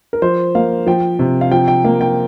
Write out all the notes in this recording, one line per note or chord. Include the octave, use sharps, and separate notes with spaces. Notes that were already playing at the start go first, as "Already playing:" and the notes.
A#4
F3 C5
A#3 F5
F3 G5
C3
F5
F3 G5
G5
A#3
G5